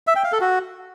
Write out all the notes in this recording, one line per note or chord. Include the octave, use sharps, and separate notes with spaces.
E5
G5
F5
A4
F#4